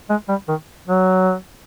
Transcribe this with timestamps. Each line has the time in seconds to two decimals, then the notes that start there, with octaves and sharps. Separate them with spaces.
0.09 G#3
0.28 G3
0.48 D#3
0.87 F#3